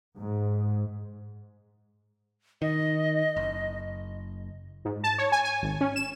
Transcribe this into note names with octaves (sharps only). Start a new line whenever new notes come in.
G#2
D#3 D#5
F#1
G#2
A5
C#5
G#5
G#5
G#1
C#4
E7